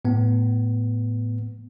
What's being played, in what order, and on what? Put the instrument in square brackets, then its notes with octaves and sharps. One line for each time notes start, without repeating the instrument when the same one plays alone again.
[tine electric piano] A2 B3